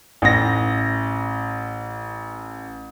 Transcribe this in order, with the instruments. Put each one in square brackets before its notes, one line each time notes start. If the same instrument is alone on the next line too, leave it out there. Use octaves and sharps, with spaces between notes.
[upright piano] A1 A#6